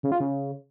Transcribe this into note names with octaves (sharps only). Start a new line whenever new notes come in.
C#3
F4
C#3